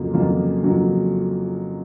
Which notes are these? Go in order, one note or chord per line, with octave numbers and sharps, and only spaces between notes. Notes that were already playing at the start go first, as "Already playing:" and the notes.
Already playing: F2 C#3 F#3 A#3 F4
F2 C#3 F#3 A#3 F4
F2 C#3 F#3 A#3 F4